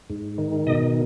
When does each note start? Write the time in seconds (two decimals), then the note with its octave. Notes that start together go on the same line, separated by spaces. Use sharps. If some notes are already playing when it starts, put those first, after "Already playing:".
0.10 G#2
0.38 D#3
0.67 B2 D#5